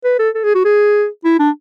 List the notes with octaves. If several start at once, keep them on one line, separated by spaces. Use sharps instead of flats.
B4
A4
A4
G#4
F#4
G#4
E4
D4